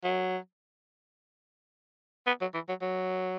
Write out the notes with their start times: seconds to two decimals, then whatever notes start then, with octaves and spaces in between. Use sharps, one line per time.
0.04 F#3
2.27 B3
2.41 F#3
2.54 E3
2.69 F#3
2.82 F#3